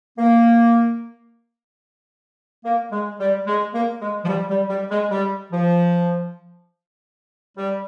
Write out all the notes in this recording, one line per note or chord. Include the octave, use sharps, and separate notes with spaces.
A#3
A#3
G#3
G3
G#3
A#3
G#3
F3
G3
G3
G3
G#3
G3
F3
G3